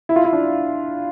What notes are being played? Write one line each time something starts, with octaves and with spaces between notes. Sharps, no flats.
E4
F4
E4
D4